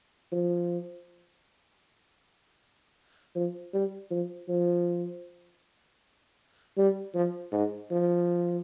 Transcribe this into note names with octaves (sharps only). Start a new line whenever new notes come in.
F3
F3
G3
F3
F3
G3
F3
G#2
F3